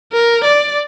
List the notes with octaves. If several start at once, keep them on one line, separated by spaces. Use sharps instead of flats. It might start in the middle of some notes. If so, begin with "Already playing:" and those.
A#4
D5